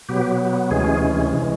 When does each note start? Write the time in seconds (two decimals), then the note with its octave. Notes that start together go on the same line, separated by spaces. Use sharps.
0.09 B2 F#3 B3 G4
0.71 D2 C3 E3 G#3 C#4 G#4
1.34 E3 G#3